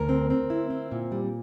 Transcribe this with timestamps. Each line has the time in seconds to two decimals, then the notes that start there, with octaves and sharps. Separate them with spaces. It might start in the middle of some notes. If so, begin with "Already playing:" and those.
Already playing: D2 A#4
0.09 C4
0.30 C4
0.50 E4
0.70 C4
0.92 A#2
1.12 G3